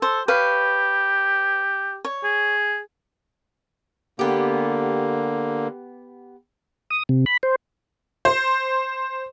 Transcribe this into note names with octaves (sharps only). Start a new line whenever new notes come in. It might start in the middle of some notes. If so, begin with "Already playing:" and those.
A4 C5
G4 B4 C#5 F5
C#5
G#4
D3 A#3 B3 G4
D#6
C3
B5
C5
C5